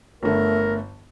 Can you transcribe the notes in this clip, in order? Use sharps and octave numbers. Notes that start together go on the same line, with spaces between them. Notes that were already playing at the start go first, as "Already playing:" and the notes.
G1 D3 A3 A#4